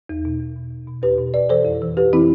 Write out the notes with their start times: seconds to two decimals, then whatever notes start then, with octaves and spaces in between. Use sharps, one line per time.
0.09 E2
0.25 B2
0.40 E2
0.56 B2
0.71 E2
0.88 B2
1.03 E2 G4 B4
1.18 B2
1.34 F2 B4 D5
1.49 E3 A4 C5
1.65 F2
1.82 E3
1.97 F2 G4 B4
2.13 E3 C4 E4